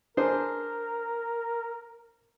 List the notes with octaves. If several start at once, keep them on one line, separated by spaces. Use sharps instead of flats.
D4 G#4 A#4 C5